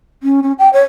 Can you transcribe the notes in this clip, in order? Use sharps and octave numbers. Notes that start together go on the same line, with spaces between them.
C#4
C#4
G5
C#5